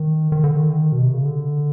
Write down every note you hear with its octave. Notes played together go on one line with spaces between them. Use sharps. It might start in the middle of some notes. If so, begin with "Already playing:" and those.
Already playing: D#3
D#3
D3
D#3
B2
C3
C#3
D3